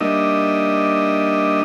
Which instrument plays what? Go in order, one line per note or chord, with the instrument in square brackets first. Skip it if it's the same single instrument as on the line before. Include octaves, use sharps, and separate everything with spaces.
[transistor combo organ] G3 A#3 D4 D#4 D#5 E5